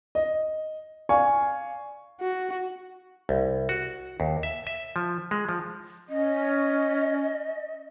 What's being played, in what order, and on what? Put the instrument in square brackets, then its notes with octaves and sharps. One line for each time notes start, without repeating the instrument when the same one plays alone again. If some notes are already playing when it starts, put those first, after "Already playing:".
[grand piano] D#5
D5 F5 G#5 C#6
[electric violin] F#4
[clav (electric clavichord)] C2
F#4
D#2
E5
E5
F3
G#3
F3
[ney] C#4 [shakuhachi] D#5